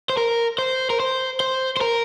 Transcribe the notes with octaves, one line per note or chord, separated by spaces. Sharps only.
C5
A#4
C5
A#4
C5
C5
C5
A#4